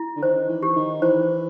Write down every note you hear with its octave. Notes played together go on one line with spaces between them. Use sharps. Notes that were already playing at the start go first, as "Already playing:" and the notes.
Already playing: E4
D3
D#3 C5
E3
G4
D#3
E3 C5